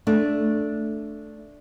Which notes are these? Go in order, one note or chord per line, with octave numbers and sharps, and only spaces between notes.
A3 D4